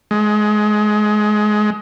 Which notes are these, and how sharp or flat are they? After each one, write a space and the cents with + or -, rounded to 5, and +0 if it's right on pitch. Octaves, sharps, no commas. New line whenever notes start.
G#3 +25